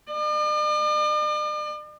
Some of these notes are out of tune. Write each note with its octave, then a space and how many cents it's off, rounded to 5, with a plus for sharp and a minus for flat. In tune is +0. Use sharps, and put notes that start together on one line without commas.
D5 +45